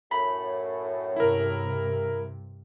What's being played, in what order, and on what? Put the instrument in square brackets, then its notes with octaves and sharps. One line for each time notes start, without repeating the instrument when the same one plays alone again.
[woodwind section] F#2 A2 [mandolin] B5
[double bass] G2 C3 [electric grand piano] E4 A#4